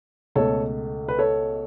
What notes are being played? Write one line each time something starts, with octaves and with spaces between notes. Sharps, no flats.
C#2 B2 A3 A4 C#5
B4
A4 C#5